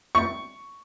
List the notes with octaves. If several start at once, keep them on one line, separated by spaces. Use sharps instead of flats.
C#6